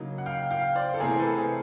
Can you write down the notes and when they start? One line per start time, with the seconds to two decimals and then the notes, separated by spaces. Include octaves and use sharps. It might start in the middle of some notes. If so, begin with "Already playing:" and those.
Already playing: C#3 F#3 A#3 D#4
0.18 F#5
0.26 F5 G5
0.51 F5 G5
0.75 C5 D5
0.94 A4
1.00 C3 E3 A3 C4 G#4 A#4
1.19 A4 B4
1.37 G#4 A#4